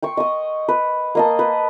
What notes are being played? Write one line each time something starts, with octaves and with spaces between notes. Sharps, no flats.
G5 C6 C#6
D#5 D#6
B4
A#3 D#5 A5
B4